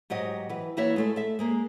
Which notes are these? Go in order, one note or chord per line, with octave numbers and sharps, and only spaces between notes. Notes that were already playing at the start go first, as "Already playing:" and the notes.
G#2 F#3 G4 D#5
E3 B4
E3 A#3 E4 F#4 C#5 E5
G#3 A3 A4
A4 E5
G#3 A#3 G#4